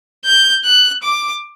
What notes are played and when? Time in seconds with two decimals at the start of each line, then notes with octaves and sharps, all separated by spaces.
0.25 G6
0.65 F#6
1.03 D6